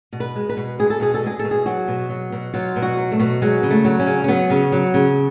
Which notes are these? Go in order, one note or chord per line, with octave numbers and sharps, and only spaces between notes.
B2
B4
G#3
B4
B2
G#3 G#4
A4
B2 G#4
A4
G#3 G#4
B2 A4
G#4
F#3 F#4
B2
F#3
B2
F#3 F4
B2
F#4
F#3
A3
B2
F#3 G#3
C#3
A3
F#3
C#4
C#3
C#4
F#3 B3
C#3
F#3
C#3